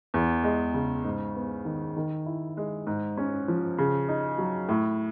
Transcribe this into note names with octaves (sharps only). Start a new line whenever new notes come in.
E2
G#3
C#3
G#2
B3
D#3
D#3
E4
G#3
G#2
C#4
F3
C#3
D#4
F#3
A2